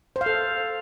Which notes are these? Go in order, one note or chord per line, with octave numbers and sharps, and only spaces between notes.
C5
F5
A4